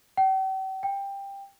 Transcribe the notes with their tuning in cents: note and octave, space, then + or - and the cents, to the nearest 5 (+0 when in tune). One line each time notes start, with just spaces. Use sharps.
G5 -45
G5 +15